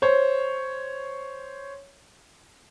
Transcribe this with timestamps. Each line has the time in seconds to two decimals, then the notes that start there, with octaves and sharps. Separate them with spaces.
0.02 C5 C#5